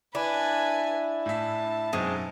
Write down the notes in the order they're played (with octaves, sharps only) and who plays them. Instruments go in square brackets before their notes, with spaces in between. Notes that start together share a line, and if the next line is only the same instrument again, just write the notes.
[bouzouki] D4 [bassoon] E4 [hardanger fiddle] B4 G#5
[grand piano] A2 E5 [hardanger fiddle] A5
[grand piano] F#2 B2 D#4 [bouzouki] G#3 [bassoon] C4